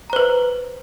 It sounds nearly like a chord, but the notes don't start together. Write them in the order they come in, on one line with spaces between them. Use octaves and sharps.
A#5 C5 B4